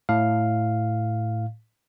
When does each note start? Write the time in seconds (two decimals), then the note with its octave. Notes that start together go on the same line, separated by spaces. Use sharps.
0.09 A2 F5